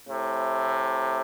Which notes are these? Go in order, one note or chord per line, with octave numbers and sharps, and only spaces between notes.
A2 C3